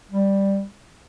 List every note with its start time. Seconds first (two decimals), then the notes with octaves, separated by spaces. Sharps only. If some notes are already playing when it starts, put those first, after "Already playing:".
0.11 G3